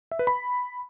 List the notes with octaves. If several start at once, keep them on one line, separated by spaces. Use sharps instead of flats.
E5
B4
B5